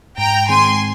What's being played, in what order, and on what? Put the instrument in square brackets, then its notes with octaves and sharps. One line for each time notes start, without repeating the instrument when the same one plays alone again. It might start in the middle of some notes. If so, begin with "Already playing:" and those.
[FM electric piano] G#2 [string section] G5 A#5
[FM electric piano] D#3 G#3 C4 [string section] G#5 C6